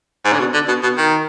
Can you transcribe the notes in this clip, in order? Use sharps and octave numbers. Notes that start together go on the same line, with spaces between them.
G#2
D3
B2
D3
B2
B2
D#3